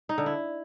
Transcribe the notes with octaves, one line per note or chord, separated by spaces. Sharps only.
D#4
D3
E4